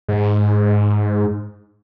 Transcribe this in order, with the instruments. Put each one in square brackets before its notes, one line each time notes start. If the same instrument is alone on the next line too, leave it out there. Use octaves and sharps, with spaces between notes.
[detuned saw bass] G#2